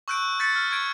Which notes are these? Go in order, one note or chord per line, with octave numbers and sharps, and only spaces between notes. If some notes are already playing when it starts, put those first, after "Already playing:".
C#6 E6 F#6 G6 D7
G6 A6 B6 C#7
F6
C#6 G#6 D7